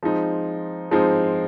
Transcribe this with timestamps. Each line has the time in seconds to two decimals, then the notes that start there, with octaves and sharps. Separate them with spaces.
0.03 F3 G#3 C4 D#4
0.91 F3 G#3 C4 D#4